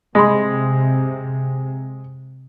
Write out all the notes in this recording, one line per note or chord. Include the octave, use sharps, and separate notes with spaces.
C3 G#3 D#5 B5 C6